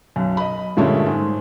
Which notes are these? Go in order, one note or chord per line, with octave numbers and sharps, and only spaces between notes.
B1 F#2
D#5 B5
G2 A#2 D3 G#3 A3 C#4
G#2